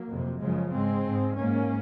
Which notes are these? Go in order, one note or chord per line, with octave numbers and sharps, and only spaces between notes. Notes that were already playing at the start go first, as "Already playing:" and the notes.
Already playing: F#3 A#3
F2
C3
F#2 C#3 F3 G#3
G#2 G#3 C4
G#2
G#2 A#3 C#4